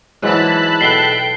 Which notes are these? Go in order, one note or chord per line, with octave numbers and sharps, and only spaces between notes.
G#2 E3 F#3 G#3 E4 A5 B5 F#6
B2 B3 A4 E5 G5 C7 G7